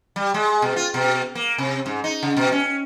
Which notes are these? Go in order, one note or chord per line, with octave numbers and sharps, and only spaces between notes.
G3
G#3
B2
F4
B2
A#3
C3
G#2
D#4
C#3
B2
C#4